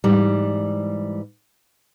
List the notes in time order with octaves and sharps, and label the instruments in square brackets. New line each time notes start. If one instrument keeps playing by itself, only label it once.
[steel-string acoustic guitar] G#2 E3 G3